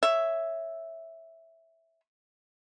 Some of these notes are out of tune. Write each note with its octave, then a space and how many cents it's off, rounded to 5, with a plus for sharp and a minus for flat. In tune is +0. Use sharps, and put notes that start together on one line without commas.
C#5 +0 E5 +0